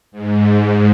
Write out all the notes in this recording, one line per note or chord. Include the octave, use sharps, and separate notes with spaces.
G#2